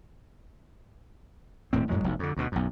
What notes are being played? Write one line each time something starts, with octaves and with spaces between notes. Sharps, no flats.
D#1 A2 C4
F#2 A2 F#3 G#3
F1 B1
F2 D3
D2 B2
B1 F#2